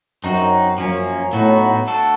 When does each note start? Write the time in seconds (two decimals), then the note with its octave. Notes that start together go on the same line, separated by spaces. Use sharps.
0.24 F#2 C4 D#4 F#4
0.78 F#2 F3 A#3 C#4
1.33 A2 F#3 B3 D#4 F#4
1.87 A3 D4 F#4 A4